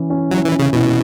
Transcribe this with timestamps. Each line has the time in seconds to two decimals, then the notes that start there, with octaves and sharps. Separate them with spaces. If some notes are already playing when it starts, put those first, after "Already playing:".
Already playing: E3 C#4 E4
0.10 C#4
0.30 F#3 E4
0.45 E3
0.52 C#4
0.59 C#3
0.73 B2 E4